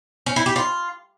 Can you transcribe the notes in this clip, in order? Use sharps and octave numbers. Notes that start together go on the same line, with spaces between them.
C#4
E4
G4
F4